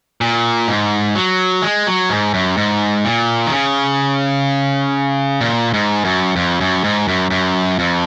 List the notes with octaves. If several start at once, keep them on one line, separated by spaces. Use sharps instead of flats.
A#2
G#2
F#3
G#3
F#3
G#2
F#2
G#2
A#2
D#3
C#3
A#2
G#2
F#2
F2
F#2
G#2
F#2
F#2
F2